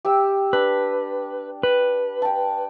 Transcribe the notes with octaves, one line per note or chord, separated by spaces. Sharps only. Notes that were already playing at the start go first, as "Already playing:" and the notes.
G4 G5 E6
D4 B4
B4
G5 A5